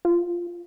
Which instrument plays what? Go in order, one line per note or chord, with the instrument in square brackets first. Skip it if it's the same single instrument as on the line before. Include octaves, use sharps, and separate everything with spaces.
[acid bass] F4